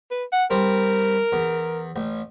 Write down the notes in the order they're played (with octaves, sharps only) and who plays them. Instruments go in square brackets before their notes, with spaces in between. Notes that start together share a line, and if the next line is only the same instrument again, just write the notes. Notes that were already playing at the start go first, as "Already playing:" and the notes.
[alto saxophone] B4
F#5
[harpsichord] G3 C4 [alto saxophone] A#4
[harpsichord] E2
A1